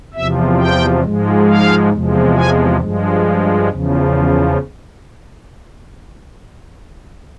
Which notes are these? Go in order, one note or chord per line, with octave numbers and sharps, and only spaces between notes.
E2 C3 F3 E5
G5
G#2 F3 G#3
F5
E2 C3 F3 G#3
G#5
G2 F3 G#3
E2 C#3 F3